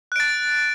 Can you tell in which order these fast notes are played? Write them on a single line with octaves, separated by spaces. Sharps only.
F#6 D7 A6